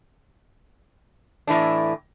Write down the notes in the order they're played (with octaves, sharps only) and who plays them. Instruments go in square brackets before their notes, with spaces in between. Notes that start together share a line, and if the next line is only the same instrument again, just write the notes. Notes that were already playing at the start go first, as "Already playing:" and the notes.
[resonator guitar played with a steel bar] A2 E3 A3 D4